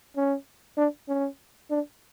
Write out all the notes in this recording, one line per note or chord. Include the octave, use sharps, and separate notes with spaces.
C#4
D4
C#4
D4